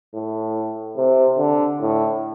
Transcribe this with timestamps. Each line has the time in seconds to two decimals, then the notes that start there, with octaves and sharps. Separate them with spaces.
0.14 A2
0.97 C3
1.38 D3
1.81 A2